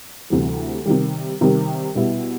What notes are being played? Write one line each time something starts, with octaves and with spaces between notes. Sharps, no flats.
D2 C3 E3 G3
C3 D#3 G3
C3 D#3 G3
B2 G3 B3 E4